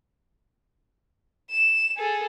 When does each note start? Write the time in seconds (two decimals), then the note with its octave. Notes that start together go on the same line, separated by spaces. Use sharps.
1.51 E7
1.97 G#4 A4